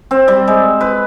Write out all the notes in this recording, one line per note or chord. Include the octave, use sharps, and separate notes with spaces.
C4
G3
G#3
B4